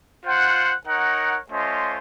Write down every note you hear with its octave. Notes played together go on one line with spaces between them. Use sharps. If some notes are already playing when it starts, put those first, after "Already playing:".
F4 C5 F#5
D#4 A#4 C#5 F#5
A3 C#4 F4 C5 D#5